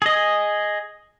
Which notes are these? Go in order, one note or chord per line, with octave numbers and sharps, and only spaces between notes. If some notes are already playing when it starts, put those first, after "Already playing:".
G#4 D#5